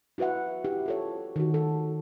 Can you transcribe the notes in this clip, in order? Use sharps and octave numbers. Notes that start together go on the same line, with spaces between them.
E4 F#4 B4 E5 F#5
E4 G4
F4 A4 C#5
D#3 F#4
A4